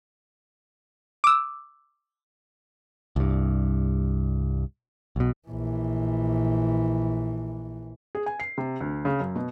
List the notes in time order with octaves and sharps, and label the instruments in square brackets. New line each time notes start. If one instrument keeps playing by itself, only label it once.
[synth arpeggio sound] D6 E6
[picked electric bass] C2 G2
B1 B2
[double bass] A#1 E3
[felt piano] G#4
G#5
C7
C3
D2
C#3
F#2
B2